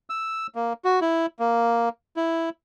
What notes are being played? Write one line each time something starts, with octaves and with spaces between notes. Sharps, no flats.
E6
A#3
F#4
E4
A#3
E4